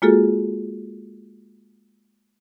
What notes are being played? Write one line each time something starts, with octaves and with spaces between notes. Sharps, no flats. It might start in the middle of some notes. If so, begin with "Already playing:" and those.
G#3 A#3 F4 F#4 G#4 A4